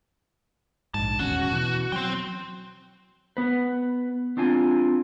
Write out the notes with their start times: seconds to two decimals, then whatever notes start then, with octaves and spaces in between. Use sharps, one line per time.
0.94 A#1 G#2 A5
1.19 D#1 E2 C#4 F#4
1.51 B2 E3
1.92 F#3 C4 G5
3.37 B3 B4
4.37 C4 D4 F4 G#5